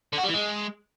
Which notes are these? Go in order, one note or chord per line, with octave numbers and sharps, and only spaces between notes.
D3
F#4
G3
E3
G#3